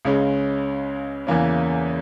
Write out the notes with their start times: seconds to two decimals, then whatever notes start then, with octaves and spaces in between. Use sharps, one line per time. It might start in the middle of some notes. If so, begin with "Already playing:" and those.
0.05 C#2 C#3 G#3 C#4
1.27 E2 C#3 E3 A#3 C#4